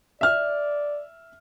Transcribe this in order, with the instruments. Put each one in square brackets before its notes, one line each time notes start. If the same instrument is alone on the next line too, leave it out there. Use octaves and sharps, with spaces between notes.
[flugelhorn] D5 [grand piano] E5 F6